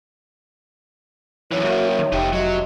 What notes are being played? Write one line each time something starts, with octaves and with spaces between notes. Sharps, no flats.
F#2 A2 E3 E4 G4 C#5
F#2 A#3 F#4
D#3 F3
F1 C3 A3 D#4 G4 A5
F#3 D#5